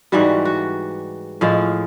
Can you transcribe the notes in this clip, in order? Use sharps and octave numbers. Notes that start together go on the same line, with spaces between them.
G#2 E3 G3 F#4
F#4
A2 F3 G#3